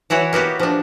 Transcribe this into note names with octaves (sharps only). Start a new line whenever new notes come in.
E3 E4 F#4 C#5
A#3 B3 F#4 G4
F3 D4